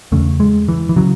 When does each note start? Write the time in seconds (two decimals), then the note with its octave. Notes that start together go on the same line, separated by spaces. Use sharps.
0.12 E2 C#3 A3
0.40 G#3
0.69 E3
0.89 E3
0.96 C#3 F#3